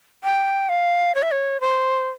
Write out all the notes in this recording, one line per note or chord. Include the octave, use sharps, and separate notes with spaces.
G5
F5
C#5
E5
C#5
C5